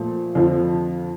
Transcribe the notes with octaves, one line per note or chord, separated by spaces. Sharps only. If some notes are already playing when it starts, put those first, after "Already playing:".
Already playing: A#2 F3 A3
F2 D3 F3